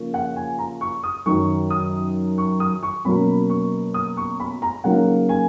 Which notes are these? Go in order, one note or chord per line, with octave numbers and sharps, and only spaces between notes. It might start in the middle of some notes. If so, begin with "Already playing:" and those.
Already playing: C#3 F3 A#3 C#4
F#5
G#5
A#5
C#6
D#6
F#2 D#3 F#3 C#6
D#6
C#6
D#6
C#6
B2 F#3 A#3 C#4 B5
C#6
D#6
C#6
B5
A#5
C#3 F#3 A#3 D#4 F#5
G#5